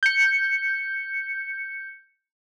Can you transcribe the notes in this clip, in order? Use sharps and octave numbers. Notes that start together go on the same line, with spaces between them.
G6 C#7